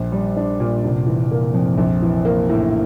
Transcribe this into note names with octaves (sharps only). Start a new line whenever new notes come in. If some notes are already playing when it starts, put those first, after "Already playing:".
Already playing: A#1
G3
D4
A#2
F1
E3
A#3
F2
A#1
E3
A#3
A2